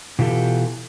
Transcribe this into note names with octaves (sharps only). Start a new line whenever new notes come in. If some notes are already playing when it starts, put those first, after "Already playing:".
B2 E3 F4 G4 A4